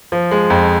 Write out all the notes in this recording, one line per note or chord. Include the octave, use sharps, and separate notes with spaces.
F3
G#3
F2